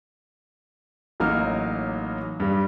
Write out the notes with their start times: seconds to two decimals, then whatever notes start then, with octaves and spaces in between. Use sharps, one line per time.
1.20 A1 F#3 A#3 D#4 F6
2.40 G2 G3